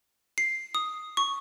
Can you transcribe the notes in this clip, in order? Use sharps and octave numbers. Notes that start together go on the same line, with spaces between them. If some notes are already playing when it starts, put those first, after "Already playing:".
C7
D#6
C#6